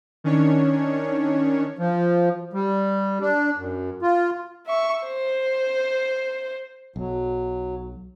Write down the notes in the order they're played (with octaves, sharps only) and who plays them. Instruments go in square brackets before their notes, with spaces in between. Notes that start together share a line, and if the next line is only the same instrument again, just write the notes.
[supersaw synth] D#3 C#4 D4 C#5
[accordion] F3
G3
D4
F#2
F4
[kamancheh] E5 C#6
C5
[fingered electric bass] B1 [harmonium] F#3